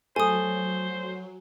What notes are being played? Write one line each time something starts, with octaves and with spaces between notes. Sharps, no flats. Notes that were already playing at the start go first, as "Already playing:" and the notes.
F#3 A3 C5 G#5 D#6